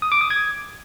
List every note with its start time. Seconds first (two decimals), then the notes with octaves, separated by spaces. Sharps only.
0.02 D#6
0.12 D6
0.21 D#6
0.30 G#6